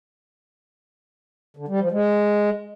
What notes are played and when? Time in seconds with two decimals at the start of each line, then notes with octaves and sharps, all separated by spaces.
1.57 D3
1.68 G3
1.80 F3
1.91 G#3